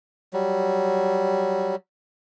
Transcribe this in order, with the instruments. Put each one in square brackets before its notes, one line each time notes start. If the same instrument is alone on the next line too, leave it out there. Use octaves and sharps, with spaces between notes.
[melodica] F#3 G3